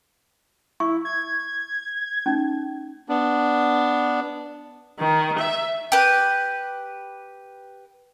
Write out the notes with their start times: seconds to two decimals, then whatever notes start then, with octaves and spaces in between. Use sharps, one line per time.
0.80 E4 C#6
1.05 G#6
2.26 C#4 D#4
3.09 B3 D4
4.99 D#3
5.38 E5
5.92 G4 B4